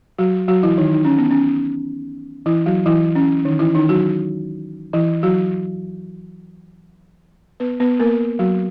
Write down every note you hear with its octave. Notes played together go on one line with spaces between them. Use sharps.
F#3 F#4
F#3 F#4
E3 E4
D#3 D#4
D#4
C#4
B3
C#4
E3 E4
F#3 F#4
E3 E4
C#4
D#3 D#4
E3 E4
D#3 D#4
F#3 F#4
E3 E4
F#3 F#4
B3 B4
B3 B4
A#3 A#4
F#3 F#4